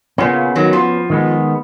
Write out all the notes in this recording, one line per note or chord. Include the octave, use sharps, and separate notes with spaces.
A#2 C#3 B3 C#4
D#3 F#3
F3
D#3 G#3 B3